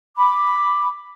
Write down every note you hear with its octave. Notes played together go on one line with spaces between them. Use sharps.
B5 D6